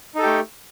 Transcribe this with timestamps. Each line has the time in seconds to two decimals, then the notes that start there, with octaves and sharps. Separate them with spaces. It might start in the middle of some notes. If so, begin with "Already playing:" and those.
0.15 D#4
0.19 A4
0.23 G4
0.26 A3